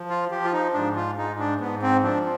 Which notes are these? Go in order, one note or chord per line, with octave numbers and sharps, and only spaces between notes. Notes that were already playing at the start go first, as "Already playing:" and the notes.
Already playing: F3
F4
F3 G4
F4
D#4
G#2 D4
F4
G#2 D#4
D4
G#2 B3
C4
F3 D4